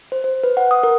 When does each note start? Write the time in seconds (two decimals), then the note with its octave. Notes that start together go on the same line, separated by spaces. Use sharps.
0.12 C5
0.24 C5
0.44 B4
0.57 F#5
0.71 D#6
0.83 A#4